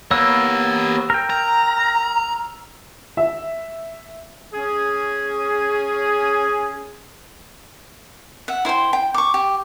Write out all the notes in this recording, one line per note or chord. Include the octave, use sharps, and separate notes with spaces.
A#3 B3 G4 C#5 E6
A#4 G5
A#5
E5
C#4 G#4
E5 F#5
E4 C5 G5 C6
G5
C#6 D6
G4